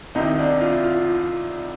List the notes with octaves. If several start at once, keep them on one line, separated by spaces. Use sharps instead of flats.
C2 C3 D#3 D#4
D4
F4
F4